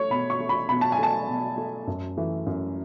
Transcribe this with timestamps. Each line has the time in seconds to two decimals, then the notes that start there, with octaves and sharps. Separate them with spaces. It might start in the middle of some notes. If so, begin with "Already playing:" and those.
Already playing: A3 C#5
0.10 B2 B5
0.30 C#6
0.40 A3
0.49 B5
0.69 B2 B5
0.81 A5
0.92 G#5
0.99 A3 A5
1.29 B2
1.58 A3
1.87 F#2
2.17 E3 A3
2.46 F#2